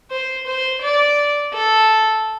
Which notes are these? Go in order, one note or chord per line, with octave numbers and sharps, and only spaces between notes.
C5
C5
D5
A4